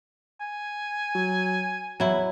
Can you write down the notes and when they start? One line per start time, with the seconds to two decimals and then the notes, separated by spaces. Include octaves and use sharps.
0.40 G#5
1.15 F#3
2.00 E2 F#3 E4